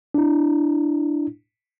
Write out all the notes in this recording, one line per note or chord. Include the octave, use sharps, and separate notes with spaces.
D4 E4